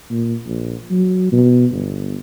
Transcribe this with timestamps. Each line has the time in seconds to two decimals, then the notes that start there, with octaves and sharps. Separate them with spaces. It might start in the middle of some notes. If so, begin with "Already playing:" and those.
0.10 A#2
0.46 A#1
0.91 F#3
1.32 B2
1.72 G1